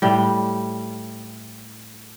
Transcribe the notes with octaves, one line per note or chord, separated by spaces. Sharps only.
A2 G3